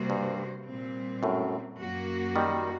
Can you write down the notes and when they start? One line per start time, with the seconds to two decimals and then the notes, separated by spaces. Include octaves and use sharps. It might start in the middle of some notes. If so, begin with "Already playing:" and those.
Already playing: C3 G3 A#3 F#4 C5
0.10 G2
0.67 A#2 G3 C4
1.23 F#2 A2
1.79 F#2 F#3 A#3 F#4
2.36 D#3 G3